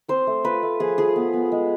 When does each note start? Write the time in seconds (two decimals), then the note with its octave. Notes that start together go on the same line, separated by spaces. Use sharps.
0.08 C4 C5
0.27 A3
0.44 F4 B4
0.63 A3
0.80 F3 G#4
0.98 F3 G#4
1.16 B3
1.34 B3
1.52 G#3